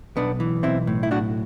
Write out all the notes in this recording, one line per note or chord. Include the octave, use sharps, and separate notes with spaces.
B1 B3 D4
E3
B1 C4 E4
A2
E4
B1 D4 F#4